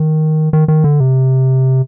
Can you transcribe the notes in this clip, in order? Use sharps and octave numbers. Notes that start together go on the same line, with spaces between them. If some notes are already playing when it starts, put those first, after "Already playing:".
Already playing: D#3
D#3
D#3
D3
C3